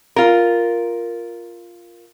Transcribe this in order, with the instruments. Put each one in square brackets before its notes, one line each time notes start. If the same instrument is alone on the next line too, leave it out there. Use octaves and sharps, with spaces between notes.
[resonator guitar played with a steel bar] F4 A#4